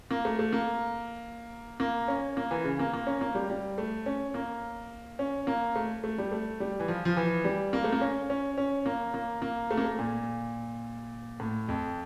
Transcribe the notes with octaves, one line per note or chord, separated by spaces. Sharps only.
A#3
A3
A3
A#3
A#3
C#4
A#3
E3
C#3
A#3
A#3
C#4
A#3
G3
G3
A3
C#4
A#3
C#4
A#3
A3
A3
G3
A3
G3
E3
F3
F3
E3
G3
A#3
A3
A#3
C#4
C#4
C#4
A#3
A#3
A#3
A3
A#3
A3
A#2
A2
F2